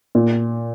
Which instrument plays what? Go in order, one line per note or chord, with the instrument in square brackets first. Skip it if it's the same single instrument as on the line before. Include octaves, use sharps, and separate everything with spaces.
[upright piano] A#2